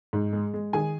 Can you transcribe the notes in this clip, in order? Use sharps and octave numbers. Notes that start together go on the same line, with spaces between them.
G#2
G#3
G#3
D#3 G#4 G#5